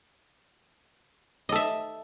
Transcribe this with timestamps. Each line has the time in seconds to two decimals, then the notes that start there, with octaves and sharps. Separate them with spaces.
1.49 D#5
1.52 A4
1.56 E5